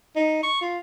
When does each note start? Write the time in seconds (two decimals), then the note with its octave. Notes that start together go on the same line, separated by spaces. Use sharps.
0.16 D#4
0.43 C#6
0.61 F4